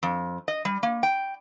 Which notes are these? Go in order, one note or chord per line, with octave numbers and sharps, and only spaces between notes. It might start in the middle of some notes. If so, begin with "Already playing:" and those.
F2
D#5
G3
A#3
G5